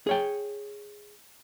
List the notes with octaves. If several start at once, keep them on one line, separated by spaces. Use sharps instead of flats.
G#4 C#5 G5